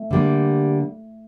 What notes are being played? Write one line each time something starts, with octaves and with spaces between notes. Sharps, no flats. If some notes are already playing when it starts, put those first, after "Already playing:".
Already playing: A3
D3 G3 A#3